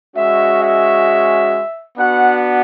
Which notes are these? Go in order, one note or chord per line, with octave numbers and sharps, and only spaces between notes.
G#3 C#4 F#4 E5
E5
B3 D4 F#4 F#5